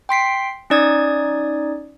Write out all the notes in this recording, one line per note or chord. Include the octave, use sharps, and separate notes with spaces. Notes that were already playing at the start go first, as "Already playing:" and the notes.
G5 C6 B6 C7
C#4 D#4 D5 D#6 G#6